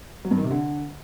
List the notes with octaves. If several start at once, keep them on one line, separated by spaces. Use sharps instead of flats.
F#3
G2
D#3
C3
D3